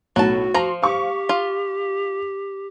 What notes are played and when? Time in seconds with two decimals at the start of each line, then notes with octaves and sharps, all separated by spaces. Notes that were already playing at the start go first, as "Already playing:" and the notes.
0.16 B1 A2 F#3 F#4 A5
0.54 F3 A#5 C6
0.82 G4 F5 C#6
1.29 F4